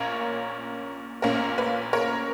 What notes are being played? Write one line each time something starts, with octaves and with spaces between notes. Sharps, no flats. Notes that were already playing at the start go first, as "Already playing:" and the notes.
Already playing: A#1 A#2 A#3 C#4 A#4 C#5
A#1 A#2 A#3 C#4 A#4
B4
A#4 C#5